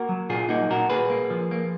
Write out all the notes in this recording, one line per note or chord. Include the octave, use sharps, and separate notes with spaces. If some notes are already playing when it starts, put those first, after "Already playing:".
Already playing: A#3 F#4 A#4
F#3
A#2 F4 G#4
A#3 D#4 F#4
A#2 F#4 A#4
A#3 G#4 B4
A#3
F3
A#3